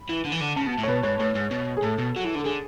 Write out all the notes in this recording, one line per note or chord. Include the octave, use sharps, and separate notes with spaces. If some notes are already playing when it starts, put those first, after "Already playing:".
Already playing: B5
E3
D3
E3
D3
C#3 A5
B2
A2
C#5
B2 B4
G#2 C#5
A2 C#5
G#2
B2
G#4
A2 A4
B2
F#3
E3
D3
A4
D3 G#4